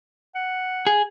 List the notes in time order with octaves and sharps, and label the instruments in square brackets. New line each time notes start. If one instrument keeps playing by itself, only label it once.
[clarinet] F#5
[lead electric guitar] G#4